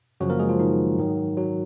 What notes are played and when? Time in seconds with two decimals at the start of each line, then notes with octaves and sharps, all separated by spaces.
0.20 F#2 C#3 F3 F#3 F#4
0.30 A#3 A#4
0.39 G#3 G#4
0.49 F3 F4
0.59 D#3 D#4
0.98 G#2 D#3 F#3
1.37 F#3 F#4